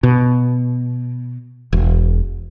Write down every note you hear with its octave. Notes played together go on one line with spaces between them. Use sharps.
B2
E1